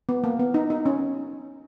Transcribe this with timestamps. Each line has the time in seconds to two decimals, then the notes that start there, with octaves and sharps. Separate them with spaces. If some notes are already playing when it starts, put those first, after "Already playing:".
0.09 B3
0.24 A#3
0.40 B3
0.54 D#4
0.70 D#4
0.86 C#4